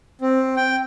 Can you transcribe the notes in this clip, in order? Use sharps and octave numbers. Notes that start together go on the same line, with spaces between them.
C4
G5